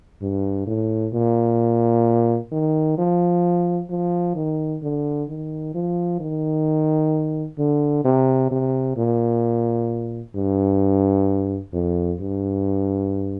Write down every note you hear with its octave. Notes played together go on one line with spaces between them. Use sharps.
G2
A2
A#2
D#3
F3
F3
D#3
D3
D#3
F3
D#3
D3
C3
C3
A#2
G2
F2
G2